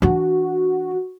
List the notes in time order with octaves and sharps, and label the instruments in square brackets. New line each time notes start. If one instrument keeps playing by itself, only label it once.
[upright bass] E3 D4 [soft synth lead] F#4